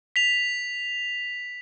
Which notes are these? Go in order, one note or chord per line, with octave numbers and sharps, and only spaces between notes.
B6 F7